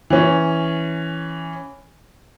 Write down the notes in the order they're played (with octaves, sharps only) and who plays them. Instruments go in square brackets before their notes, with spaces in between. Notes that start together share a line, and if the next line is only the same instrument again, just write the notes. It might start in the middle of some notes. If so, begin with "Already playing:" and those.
[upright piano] E3 C#4